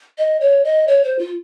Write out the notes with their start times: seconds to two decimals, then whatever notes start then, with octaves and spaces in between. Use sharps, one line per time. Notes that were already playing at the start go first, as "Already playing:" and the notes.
0.18 D#5
0.41 C#5
0.65 D#5
0.88 C#5
1.04 C5
1.19 F4